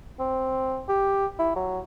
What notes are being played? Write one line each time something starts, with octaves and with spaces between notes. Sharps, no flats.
C4
G4
E4
F#3